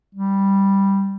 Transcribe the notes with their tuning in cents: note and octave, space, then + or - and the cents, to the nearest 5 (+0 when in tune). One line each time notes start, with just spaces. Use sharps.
G3 +0